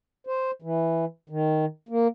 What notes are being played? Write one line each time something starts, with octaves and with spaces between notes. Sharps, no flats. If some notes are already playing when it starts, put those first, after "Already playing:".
C5
E3
D#3
A#3